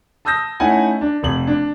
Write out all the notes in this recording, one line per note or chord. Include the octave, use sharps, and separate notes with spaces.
A5 D#6 E6 G6 A#6
A3 C#4 D#4 E4 F#5 G#5
D4
F1 F#7
D4